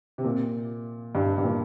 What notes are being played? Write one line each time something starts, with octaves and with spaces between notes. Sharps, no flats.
C3
A#2
G2
G2
A#2